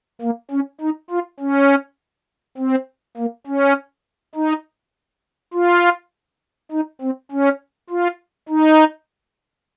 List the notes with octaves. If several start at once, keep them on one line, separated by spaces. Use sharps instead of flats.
A#3
C#4
D#4
F4
C#4
C4
A#3
C#4
D#4
F4
D#4
C4
C#4
F4
D#4